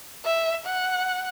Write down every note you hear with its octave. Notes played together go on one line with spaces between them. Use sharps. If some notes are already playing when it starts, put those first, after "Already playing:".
E5
F#5